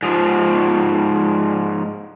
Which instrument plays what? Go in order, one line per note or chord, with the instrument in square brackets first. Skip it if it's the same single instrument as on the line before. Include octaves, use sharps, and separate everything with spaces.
[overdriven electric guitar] G#2 F3